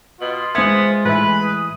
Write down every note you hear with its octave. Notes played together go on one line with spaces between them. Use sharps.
B2 F4
G#3 B3 C5 E5 G#6
A2 E3 E4 B4
D#6